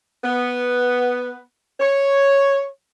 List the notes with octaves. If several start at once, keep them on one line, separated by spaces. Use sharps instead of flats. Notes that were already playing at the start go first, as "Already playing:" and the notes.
B3
C#5